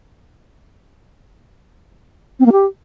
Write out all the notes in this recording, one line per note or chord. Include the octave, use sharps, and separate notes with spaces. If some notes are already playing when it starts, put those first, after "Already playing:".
C4
A#3
G4